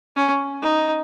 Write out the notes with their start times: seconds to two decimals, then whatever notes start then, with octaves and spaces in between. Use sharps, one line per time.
0.16 C#4
0.62 D#4